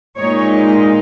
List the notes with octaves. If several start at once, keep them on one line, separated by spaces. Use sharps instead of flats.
A#2 G#3 D#4 C#5